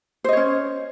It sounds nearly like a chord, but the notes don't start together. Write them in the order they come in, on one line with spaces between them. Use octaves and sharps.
C5 D#5 C#5 C#4